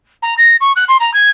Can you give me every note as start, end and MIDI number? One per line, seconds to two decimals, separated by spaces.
0.22 0.34 82
0.38 0.56 94
0.61 0.72 85
0.76 0.84 90
0.88 0.97 84
1.00 1.13 82
1.14 1.30 92